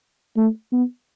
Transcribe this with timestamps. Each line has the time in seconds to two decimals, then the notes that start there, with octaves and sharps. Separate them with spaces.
0.37 A3
0.72 B3